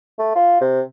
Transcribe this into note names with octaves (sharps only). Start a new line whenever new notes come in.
A3
F4
C3